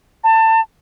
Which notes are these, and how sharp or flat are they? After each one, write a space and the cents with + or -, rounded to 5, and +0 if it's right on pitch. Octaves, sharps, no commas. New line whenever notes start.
A5 +25